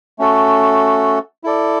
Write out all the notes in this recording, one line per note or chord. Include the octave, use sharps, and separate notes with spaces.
A3 C#4 F#4 A4
E4 A4 D5